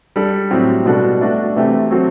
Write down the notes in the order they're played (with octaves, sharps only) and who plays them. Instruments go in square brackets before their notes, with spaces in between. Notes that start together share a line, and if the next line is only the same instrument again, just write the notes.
[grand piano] G3 D4 A4 D5
A2 F#3 C4 G4
B2 G3 D4 F#4 A4
A3 D4 F#4
C3 E3 A3 C4 G4
F#3 C4 F#4 A4 C5